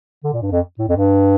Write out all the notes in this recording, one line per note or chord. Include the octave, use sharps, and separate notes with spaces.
D3
A#2
G2
F2
A2
F2
G2